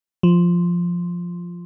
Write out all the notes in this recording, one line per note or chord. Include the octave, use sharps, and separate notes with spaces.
F3